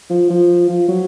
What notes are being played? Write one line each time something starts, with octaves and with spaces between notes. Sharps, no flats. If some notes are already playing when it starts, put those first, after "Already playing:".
F3
F3
F3
F#3